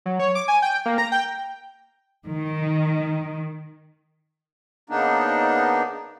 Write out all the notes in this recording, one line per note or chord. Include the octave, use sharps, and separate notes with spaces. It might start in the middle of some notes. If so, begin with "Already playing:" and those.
F#3
C#5
D6
G#5
G5
A#3
A#5
G5
D#3
C#3 A#3 B3 D4 D#4